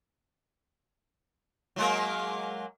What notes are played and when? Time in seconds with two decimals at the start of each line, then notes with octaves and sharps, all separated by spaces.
1.76 F#3 G#3 A#3